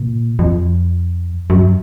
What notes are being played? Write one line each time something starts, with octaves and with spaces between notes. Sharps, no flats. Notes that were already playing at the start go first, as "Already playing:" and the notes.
Already playing: A#2
F2
F#2